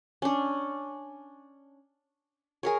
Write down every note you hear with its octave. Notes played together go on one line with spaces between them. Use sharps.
C#4 D4
G#4 A#4 C#5